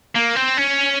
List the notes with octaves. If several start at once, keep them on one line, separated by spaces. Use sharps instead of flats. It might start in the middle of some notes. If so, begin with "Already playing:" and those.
A#3
C4
C#4